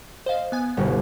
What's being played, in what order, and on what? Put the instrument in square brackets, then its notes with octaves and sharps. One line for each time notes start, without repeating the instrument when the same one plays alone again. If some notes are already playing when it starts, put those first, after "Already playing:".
[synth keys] C5 D#5 F5
B3 G#5
[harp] G1 C2 B2